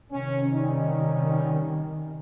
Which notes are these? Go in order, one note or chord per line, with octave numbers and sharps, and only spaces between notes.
C3 D#3 C#4
G3 C#4 D#4